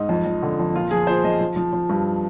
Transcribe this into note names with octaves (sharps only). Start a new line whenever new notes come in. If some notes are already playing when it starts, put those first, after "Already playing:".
Already playing: G#2 D#4
F2
F2
D3
F2
A#2 F4
F3 G#4
A#2 C5
F3 D#5
F3
F3
F3
G2